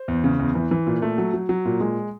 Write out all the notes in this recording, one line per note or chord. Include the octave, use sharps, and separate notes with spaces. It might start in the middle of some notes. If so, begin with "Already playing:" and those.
Already playing: C5
E2
C#3
E2
E3
E3
A#2
A3
F#3
F#3
F#3
A#2
G#3